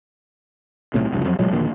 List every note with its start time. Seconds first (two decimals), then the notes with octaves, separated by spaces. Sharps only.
0.94 B1 A2 C3
1.12 F1 C2 C#3
1.25 F2 F#3
1.39 A1 A#2 F#3 G#3
1.51 A#1 D#2 D3